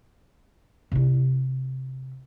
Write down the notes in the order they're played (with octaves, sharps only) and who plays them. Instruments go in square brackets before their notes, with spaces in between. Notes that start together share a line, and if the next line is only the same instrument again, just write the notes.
[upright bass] C3 E4